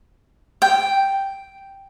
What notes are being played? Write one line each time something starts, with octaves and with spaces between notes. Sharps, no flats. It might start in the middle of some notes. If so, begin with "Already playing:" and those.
G5